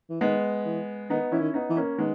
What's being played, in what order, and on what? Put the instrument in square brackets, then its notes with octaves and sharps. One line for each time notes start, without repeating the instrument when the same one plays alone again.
[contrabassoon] E3
[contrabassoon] D#3 [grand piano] G#3 B3
[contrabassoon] E3
[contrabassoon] D#3 [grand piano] B3 D#4
[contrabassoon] E3 [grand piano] C#4 E4
[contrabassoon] D#3
[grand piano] B3 D#4
[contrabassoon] E3
[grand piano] A#3 C#4
[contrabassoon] D#3 [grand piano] G#3 B3